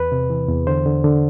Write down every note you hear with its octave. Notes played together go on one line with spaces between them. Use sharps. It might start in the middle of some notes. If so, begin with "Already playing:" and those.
Already playing: E2 B4
C3
E3
E2
D3 C5
D3
D3